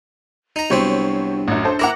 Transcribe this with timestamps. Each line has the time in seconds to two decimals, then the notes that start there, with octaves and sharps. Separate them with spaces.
0.56 D#4 A#5
0.70 C2 F#3 B3 C4 D4 C5 C#5
1.48 A1 F#2
1.65 D4 A4 C5
1.79 E4 A#4 F#5 A#5 D6 A#6